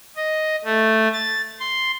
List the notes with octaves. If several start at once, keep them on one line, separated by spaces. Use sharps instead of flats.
D#5
A3
A6
C6